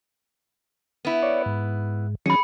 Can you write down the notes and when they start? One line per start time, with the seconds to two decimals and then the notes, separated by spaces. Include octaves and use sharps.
1.05 B3 E4
1.23 C#5 D5
1.46 G#2
2.26 D#3 F#3 C#4 G#4 B5 C#7